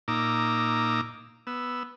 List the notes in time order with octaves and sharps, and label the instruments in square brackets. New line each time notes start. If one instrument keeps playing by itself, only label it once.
[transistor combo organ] A#2 D#4 A#5 D6 E6
B3 E6